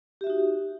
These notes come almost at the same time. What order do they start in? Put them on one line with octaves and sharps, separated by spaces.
G4 E5 F#4 D#4